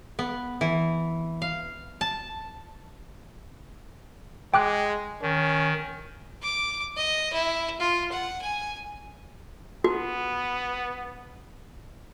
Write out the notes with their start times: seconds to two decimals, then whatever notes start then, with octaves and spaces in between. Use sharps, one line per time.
0.19 B3
0.61 E3
1.42 F5
2.01 A5
4.54 G#3 G5 D6 F#6
5.22 D#3 C#4
6.42 D6
6.97 D#5
7.33 E4
7.80 F4
8.12 F#5
8.42 G#5
9.84 B3 F#4